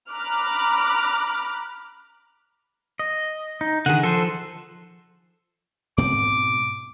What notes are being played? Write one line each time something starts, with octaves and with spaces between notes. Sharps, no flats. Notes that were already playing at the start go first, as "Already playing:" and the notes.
A#5 B5 D6 F6 F#6
D#5
D#4
D3 D#3 G#4 F#5
F3 A4 C5
G#2 B2 C4 D6